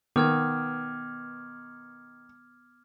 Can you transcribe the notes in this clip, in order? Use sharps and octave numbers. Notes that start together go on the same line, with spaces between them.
D#3 B3 D6 F6 G#6